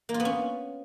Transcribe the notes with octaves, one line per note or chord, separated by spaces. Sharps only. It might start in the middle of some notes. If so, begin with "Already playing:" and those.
A#3
F4
B3
C#4